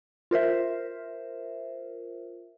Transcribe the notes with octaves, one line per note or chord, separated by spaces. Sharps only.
F4 A#4 C5 E5